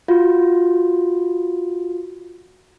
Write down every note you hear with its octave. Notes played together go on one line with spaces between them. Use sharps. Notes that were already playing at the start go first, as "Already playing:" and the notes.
F4 F#4